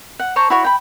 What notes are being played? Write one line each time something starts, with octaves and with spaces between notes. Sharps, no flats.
F#5
C5 C#5 A5 A#5
E4 F#4 C#5
G5 B5